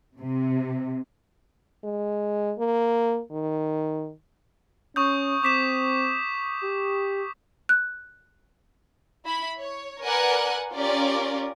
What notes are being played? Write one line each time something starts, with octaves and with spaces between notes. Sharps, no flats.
C3
G#3
A#3
D#3
C#4 C#6 D#6 G6
C4 D6 B6 E7
G4
F#6
E4 B5
C#5
A#4 B4 D5 F#5 G#5 F#6
C#4 F4 G4 A#4 D5